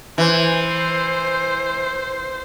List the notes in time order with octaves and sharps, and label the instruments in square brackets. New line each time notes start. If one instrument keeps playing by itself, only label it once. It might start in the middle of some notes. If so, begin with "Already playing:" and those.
[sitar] E3 [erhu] C5